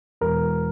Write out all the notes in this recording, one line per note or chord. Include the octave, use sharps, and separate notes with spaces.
E1 A#4